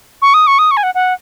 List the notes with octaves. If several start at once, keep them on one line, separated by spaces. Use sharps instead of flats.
C#6
D#6
C#6
D#6
C#6
G#5
F#5
F#5